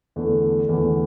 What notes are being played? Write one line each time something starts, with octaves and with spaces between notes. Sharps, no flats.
E2 D3 A3
E2 D3 A3